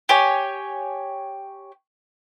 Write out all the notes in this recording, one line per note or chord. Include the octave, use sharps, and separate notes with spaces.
G4 C#5 G#5